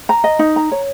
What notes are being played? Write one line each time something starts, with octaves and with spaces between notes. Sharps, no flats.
A#5
D#5
D#4
A#5
C#5